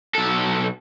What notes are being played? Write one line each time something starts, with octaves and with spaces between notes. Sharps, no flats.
B1 A4